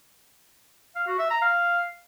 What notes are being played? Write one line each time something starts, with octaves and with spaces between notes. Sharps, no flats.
F5
F#4
E5
A#5
F5